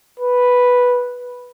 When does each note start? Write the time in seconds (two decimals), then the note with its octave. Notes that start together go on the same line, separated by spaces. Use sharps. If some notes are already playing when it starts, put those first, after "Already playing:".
0.20 B4